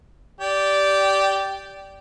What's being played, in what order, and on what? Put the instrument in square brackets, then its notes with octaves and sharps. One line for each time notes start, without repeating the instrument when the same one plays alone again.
[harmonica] G4 D5